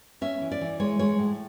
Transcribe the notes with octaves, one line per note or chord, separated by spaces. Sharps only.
C#4 E5
E3
D5
E3
G#3 C#5
G#3 C#5
A2